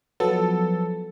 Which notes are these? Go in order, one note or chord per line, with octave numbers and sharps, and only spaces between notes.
F3 F#3 B3 A4